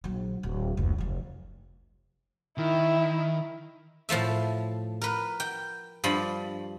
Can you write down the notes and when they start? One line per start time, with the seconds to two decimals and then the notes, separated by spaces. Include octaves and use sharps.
0.04 A#1 F#3
0.43 D1
0.77 F1 C#2
0.98 F1 F3
2.58 D#3 E4
4.09 A2 F3 A3 E5
5.02 A#4 B4
5.40 G5
6.04 G2 F3 B5